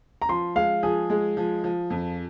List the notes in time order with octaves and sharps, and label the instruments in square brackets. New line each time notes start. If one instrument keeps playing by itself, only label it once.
[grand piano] A#5
[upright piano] F3 [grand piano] C6
[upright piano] G#3 [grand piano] F5
[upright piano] F3 [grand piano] G#4
[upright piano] G#3
F3
F3
F2